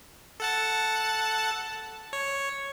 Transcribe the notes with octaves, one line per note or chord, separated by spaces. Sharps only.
A4 F#5 A5
C#5